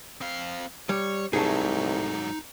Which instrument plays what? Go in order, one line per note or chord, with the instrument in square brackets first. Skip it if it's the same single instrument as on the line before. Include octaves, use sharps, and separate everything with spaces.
[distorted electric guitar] C4 F5
[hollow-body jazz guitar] G3 [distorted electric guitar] C#5
[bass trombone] C2 [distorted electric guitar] G#2 F#3 [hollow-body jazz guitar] A3 G#4 [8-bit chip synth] D#4